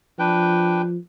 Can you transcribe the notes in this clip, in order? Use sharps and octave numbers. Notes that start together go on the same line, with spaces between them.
F3 D4 B4 G5